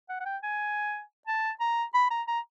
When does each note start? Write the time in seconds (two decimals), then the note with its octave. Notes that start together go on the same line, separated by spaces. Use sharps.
0.09 F#5
0.20 F#5
0.25 G5
0.43 G#5
1.27 A5
1.60 A#5
1.94 B5
2.10 A#5
2.28 A#5